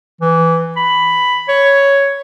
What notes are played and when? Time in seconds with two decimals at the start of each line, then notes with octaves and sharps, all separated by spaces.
0.21 E3
0.77 B5
1.49 C#5